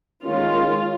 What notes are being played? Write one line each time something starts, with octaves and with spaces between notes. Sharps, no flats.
D#3 G#3 C#4 F4